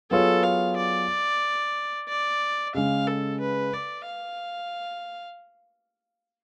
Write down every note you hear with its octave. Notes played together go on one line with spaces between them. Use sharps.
F#3 B3 F4 G#4 A4 C#5
F5
D5
D5
C#3 G#3 C#4 F5
A4
B4
D5
F5